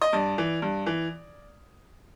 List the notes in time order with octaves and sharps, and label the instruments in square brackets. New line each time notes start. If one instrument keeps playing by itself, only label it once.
[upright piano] D#5
G2 D5
E3
G2
E3